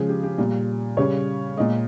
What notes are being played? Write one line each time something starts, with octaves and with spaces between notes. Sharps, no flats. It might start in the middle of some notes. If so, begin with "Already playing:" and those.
Already playing: C#3 F3 G#3 G#4
G4
G4
A#2 G3
C#3 G3 C#5
A#2 G#3 D#5